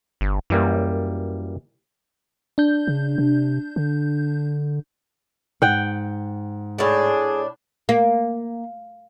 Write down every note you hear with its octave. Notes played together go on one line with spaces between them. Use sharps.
G1
F#2 E3 G3 A#3
D4 G6
C#3
C3
D3
G#2 F#5 G5
A2 D4 G#4
A#3